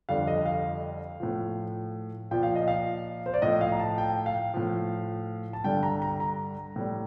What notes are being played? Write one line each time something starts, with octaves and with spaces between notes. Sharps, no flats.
F2 D3 G3 F5
D#5
F5
A2 F3
A#2 F3 G5
F5
D#5
F5
C5
D5
A2 F3 D#5
F5
A#5
A5
G5
F5
A2 F3
A5
G2 D3 G3 G5
A#5
A#5
A#5
A2 G3